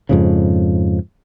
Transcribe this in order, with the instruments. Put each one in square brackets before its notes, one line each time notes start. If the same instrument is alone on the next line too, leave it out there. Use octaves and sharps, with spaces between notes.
[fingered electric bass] F2 G#2 C#3